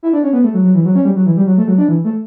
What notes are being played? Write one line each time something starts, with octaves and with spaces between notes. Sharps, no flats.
E4
D4
C#4
B3
A3
F#3
F#3
E3
F#3
C#4
G3
F#3
E3
G3
F#3
A3
F#3
D4
E3
A3